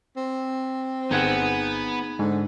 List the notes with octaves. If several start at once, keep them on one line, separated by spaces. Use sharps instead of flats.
C4
G1 B3 D#4 G#4 F#5
G#2 D3